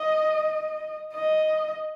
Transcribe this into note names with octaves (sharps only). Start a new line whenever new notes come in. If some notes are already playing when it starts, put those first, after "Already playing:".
Already playing: D#5
D#5